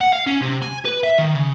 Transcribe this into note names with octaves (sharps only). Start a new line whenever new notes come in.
F#5
F5
C#4
C3
G#5
B4
E5
D#3
C#3